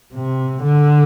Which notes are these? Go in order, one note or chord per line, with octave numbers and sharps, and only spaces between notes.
C3
D3